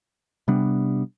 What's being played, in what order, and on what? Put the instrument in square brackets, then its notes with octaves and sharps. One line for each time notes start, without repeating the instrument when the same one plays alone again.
[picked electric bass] C3 G3 B3 D4